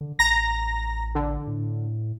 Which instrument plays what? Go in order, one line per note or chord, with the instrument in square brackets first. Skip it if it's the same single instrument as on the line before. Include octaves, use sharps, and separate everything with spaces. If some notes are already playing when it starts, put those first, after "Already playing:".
[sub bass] D3
[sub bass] A1 [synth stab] A#5 A#6
[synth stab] D3
[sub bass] A2